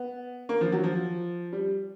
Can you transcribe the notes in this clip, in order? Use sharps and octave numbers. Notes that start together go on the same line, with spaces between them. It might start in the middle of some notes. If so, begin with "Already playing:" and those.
Already playing: B3
A#3
F3
F#3
F3
G3